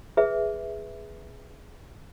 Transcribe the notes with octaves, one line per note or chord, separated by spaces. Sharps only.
G#4 B4 E5